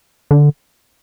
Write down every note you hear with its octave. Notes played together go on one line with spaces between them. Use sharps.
D3